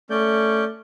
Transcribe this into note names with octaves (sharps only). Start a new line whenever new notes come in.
A3 C#4 D5 G6